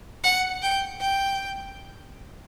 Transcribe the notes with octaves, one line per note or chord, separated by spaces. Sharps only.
F#5
G5
G5